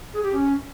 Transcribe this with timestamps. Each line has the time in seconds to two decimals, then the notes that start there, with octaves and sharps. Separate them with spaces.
0.14 G#4
0.23 G4
0.33 C#4